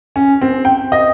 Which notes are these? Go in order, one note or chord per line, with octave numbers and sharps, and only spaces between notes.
C#4
C4
G5
D#5